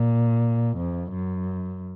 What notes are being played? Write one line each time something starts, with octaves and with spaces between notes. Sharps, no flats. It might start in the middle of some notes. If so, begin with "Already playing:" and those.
Already playing: A#2
F2
F#2